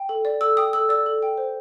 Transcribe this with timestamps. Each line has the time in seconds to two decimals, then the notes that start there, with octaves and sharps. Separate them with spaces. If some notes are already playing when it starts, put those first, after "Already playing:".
Already playing: G5
0.09 A4
0.25 D5
0.41 A4 E6
0.57 G5 D#6
0.73 A4 E6
0.89 D5 E6
1.06 A4
1.23 G5
1.38 C5